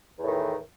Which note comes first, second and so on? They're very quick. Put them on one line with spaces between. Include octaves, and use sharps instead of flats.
E2 A2 D#3 E3